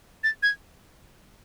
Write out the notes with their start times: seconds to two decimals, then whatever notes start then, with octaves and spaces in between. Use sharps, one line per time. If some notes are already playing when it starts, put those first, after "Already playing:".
0.24 A6
0.43 G#6